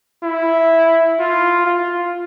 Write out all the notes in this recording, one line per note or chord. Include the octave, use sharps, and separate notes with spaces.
E4
F4
F4